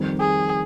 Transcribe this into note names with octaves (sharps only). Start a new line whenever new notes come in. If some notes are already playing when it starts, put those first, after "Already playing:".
Already playing: F2 D#3 G3
G#4